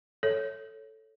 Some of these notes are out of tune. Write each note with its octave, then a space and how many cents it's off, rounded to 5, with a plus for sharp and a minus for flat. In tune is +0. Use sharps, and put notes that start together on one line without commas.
A4 +0 C#5 +0 E5 -45